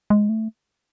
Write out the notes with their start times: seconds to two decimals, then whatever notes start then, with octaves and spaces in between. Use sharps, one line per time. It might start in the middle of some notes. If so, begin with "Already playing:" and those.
0.10 G#3
0.29 A3